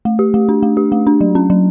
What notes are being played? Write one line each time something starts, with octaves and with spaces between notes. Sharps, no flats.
A3
G4
A3
D4
A3
G4
A3
D4
F#3
C#4
F#3